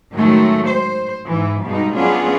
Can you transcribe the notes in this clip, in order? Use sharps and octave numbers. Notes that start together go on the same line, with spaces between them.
F#2 A2 D#3 F#3 G#3 A3
C5
G#2 E3
G2 B2 G#3 D#4
F#3 B3 C#4 D4 F4 G#4